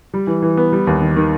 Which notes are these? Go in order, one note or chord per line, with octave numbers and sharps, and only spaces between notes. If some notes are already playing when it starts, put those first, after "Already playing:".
G3
E3
E3
B3
G3
D#2
D#3
D#3